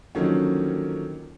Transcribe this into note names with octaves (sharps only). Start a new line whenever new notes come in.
D3 D#3 F3 F#3 A#3 C#4